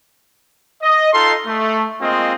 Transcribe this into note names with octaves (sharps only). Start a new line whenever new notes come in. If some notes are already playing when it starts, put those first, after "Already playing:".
D#5
D#4 F4 A4 C6
A3
G#3 A#3 C4 F4 D#5